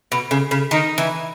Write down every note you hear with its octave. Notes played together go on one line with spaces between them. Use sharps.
B2
C#3
C#3
D#3 D#4
E3